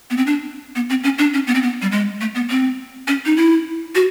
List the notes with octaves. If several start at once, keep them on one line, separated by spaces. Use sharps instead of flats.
B3
C4
D4
B3
C4
C#4
D4
C#4
B3
C4
B3
G3
G#3
A3
B3
C4
C#4
D#4
E4
F#4